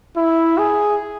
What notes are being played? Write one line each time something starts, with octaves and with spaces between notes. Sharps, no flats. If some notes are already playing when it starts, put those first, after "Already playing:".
E4
G#4